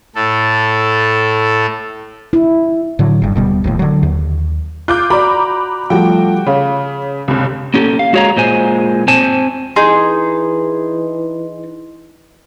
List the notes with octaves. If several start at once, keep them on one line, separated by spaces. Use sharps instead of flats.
A2 A4
E4
A2 D3 F#3
F#1 G2
D#1 B2 G3
E1 D#2 A2
D3 F#3
D#2
F4 D6 F#6 G6
F#4 D5 A#5 B5 D6
F3 G3 A3 F#4 G5
C#3 C#5 F5
G1 C#2 C3
A#3 C#4 G4 A4
F5
G#3 F#4 G#4 C#5 F5 A#5
A#2 G#3 C5 G#5
C4 C5 G#5 A5
E3 D#4 G#4 C6